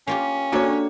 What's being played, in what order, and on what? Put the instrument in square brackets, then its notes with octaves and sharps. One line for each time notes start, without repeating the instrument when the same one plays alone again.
[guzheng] A#3 F4 G4 [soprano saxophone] C#4
[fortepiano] A#3 C#5 [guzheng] D4 G4 A4 [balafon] F#4